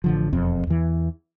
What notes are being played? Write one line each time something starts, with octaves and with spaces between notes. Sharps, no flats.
A1 D3 F3
E1 F2 C4
E2 E3